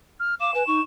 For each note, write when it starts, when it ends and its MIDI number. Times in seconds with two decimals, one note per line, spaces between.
0.20 0.35 89
0.41 0.53 77
0.41 0.51 86
0.41 0.82 100
0.54 0.64 71
0.54 0.63 80
0.67 0.80 63
0.67 0.81 85